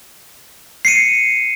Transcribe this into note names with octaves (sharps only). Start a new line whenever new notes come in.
C7 C#7 D#7